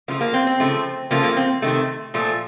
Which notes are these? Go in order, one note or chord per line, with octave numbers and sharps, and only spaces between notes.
C#3 F3 A3 A#3
A#3
C4
C4
C#3 F3 A3
C#3 F3 A3 A#3
A#3
C4
C3 D#3 A3
A#2 F3 A3